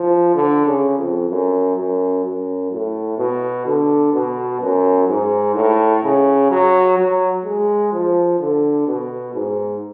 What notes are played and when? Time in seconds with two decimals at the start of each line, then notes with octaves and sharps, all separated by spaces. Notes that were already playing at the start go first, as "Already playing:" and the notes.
Already playing: F3
0.35 D3
0.66 C#3
0.98 F2
1.29 F#2
1.77 F#2
2.25 F#2
2.72 A2
3.18 B2
3.66 D3
4.13 B2
4.61 F#2
5.08 G#2
5.55 A2
6.03 C#3
6.50 F#3
6.98 F#3
7.45 G#3
7.92 F3
8.40 D3
8.87 B2
9.34 G#2